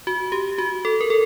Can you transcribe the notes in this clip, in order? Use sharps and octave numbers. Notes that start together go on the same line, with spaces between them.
F#4
G4
F#4
A4
A#4
A4